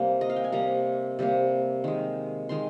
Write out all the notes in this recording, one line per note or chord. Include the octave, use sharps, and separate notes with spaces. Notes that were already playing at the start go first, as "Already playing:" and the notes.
Already playing: C3 G3 A#3
D#5
F5
G5
G#5
C3 G3 A#3 A#5
C3 G3 A#3
D#3 G#3
D#3 G#3 C6